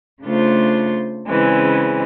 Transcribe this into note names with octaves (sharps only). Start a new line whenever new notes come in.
C#3 A3 D4 F4 C5
C#3 E3 G#3 C4